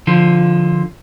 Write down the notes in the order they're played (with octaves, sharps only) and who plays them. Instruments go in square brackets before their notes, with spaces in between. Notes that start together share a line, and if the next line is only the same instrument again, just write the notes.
[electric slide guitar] D3 F3 F4